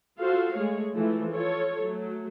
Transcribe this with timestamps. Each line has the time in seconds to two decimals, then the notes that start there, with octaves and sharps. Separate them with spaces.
0.20 F4 F#4 A4 C5 F5
0.55 G#3 A3 G#4 C#5
0.94 E3 F3 A3
1.34 F4 A4 C#5
1.81 F#3 A3